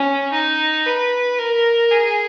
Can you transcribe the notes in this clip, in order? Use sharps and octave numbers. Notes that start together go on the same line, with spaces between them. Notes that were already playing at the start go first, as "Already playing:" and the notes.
Already playing: C#4
D#4
B4
A#4
G#4